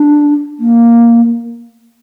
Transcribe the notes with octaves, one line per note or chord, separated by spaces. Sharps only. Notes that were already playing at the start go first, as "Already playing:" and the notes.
Already playing: D4
A#3